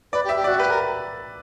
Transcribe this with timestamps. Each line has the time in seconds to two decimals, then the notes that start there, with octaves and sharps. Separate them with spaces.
0.12 B4 D5
0.24 G4
0.29 E5
0.36 G4
0.44 F#4 D5
0.59 G4 B4
0.70 A#4